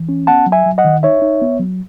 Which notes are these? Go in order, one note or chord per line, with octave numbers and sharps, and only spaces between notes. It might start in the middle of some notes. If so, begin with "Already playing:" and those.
Already playing: E3
C#4
B3 F#5 A5
F#3
E5 G#5
F#3
D#5 F#5
D#3
D#4 C#5 E5
D#4
B3
F#3